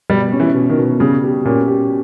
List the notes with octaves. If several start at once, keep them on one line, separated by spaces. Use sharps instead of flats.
B2 G3
C#4
E3
B2
D#3
B2
C#3 G3
G4
A#2 C#4
G4